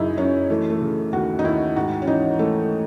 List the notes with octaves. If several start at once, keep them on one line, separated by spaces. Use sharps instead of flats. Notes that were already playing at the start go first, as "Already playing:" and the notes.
Already playing: F#2 C#3 D#4 E4 G#4
F#2 C#4
E3 A3
A3
C#3
D#2 F#4
D#4
D#2 E4
G#2 F#4
C#4
E3 D#4
E3 A3